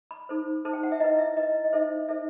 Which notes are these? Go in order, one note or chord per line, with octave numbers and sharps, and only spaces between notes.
B5
D#4 A4 C5
D#4 A4 C5 A5
G5
F#5
E5
E4 B4 D#5
E5
E4 B4 D#5
D#5
D#4 A4 C5 E5
D#4 A4 C5 E5